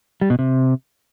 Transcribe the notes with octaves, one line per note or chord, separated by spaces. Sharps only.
G3
B2
C3